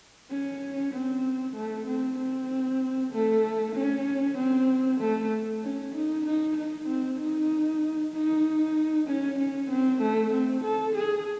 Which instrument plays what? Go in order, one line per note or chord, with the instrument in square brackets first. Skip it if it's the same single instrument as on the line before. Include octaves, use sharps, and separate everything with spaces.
[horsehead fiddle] C#4
C4
A3
C4
C4
A3
C#4
C4
A3
C#4
D#4
D#4
D#4
C4
D#4
D#4
C#4
C#4
C4
A3
C4
A4
G#4